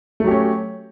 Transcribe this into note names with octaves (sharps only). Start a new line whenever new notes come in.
F#3 A3 C#4 G4